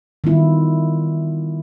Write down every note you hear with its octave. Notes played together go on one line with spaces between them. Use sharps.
D#3 G3 B3 E4 F4